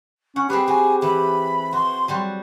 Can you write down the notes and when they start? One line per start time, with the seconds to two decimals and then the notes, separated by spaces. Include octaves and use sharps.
0.36 C#4 F#5
0.50 C4 G4 G#4 B4 B5
0.68 F#4 G#5
1.02 E3 B5
1.73 F#4 C6
2.08 F#3 G3 F#4